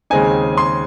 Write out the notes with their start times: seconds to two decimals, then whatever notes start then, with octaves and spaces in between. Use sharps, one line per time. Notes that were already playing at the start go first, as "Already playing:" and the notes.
0.10 D#2 C#3 G#3 C4 D#4 G#5
0.57 C6